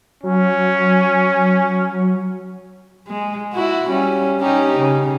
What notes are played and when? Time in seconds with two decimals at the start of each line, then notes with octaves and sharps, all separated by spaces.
0.23 F#3 C#4
3.08 G#3
3.54 E4 F#4
3.90 G3 C#4
4.40 C#4 D#4 G4
4.80 C#3